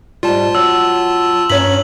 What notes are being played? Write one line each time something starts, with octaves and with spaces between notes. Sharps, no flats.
G#2 G3 F4 A5
F#3 E6
G2 C#4 C#5 A#5 B6 F#7